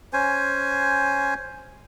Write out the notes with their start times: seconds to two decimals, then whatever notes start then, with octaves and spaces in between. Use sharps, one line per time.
0.13 C#4 C5 G#5